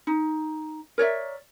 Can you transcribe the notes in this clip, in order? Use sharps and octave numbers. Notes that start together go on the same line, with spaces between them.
D#4
A#4 C#5 D5 E5